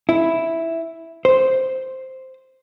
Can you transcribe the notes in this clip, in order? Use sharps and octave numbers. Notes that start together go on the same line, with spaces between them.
E4
C5